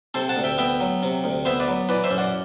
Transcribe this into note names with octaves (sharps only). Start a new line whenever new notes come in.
C3 A4 C5
F#5 A5
D2
E5 G5
B3 E5 G5
F#3
C3
D2
B3 C5 E5
B4 D5
F#3
E3 B4 D5
C5 E5
F#2
D5 F#5